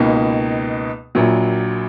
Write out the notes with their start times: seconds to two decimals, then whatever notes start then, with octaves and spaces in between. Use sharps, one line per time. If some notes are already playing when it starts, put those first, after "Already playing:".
Already playing: C#2 B2 A#3 D#4
1.15 A#1 A#2 F#3